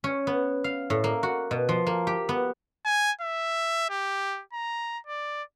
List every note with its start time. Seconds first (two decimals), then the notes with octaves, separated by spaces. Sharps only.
0.04 C#4
0.27 B3
0.64 F5
0.90 A2
1.04 A#3
1.23 F#4
1.51 B2
1.69 F3
1.87 A#3
2.07 G4
2.29 B3
2.85 G#5
3.21 E5
3.90 G4
4.53 A#5
5.07 D5